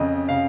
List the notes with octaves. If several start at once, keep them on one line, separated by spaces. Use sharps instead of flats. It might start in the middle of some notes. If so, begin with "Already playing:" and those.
Already playing: F2 C#3 D#5
C#3 F5